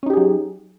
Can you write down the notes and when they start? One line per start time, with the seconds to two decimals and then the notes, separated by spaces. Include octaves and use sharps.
0.03 C#4
0.06 D#4
0.10 G4
0.13 G#4
0.17 F#3